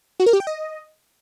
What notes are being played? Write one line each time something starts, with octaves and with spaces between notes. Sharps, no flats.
F#4
A#4
G4
G5
D#5